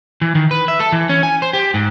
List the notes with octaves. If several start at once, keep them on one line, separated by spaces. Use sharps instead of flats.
E3
D#3
B4
E5
A4
E3
C#4
G#5
C5
G4
G#2